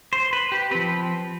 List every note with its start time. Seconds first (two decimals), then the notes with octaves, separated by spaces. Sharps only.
0.13 C5
0.33 B4
0.52 G4
0.71 F3 C4 B4